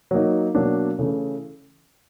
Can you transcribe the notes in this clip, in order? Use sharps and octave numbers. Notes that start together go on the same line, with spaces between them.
F#3 A#3 D#4
B2 F#3 A#3 D4
C#3 E3 A3